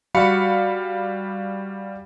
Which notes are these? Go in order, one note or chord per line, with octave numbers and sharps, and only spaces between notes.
G3 F#4 F5 B5 C#7